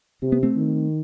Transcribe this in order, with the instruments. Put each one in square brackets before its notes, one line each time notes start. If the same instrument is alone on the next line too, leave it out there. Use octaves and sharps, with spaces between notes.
[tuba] C3 [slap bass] C4
[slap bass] B3
A3 C4
[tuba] D#3